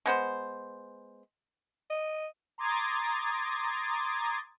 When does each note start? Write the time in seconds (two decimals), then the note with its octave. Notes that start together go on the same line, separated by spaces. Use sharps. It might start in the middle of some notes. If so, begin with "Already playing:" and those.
0.06 G#3 B3 C5
1.90 D#5
2.58 A#5 C6 D6 D#6 G#6 A6